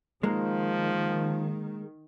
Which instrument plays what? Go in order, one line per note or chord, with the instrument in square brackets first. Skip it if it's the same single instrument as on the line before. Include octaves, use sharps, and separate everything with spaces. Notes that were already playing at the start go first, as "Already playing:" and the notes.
[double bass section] D#3 [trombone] F3 [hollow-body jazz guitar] G#3 A#3